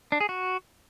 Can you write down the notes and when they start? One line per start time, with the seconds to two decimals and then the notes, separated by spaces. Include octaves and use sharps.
0.12 D4
0.21 G#4
0.29 F#4